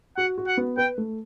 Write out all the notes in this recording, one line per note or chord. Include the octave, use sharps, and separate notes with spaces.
F#4 F#5
F#4
F#5
B3
B4 G5
A3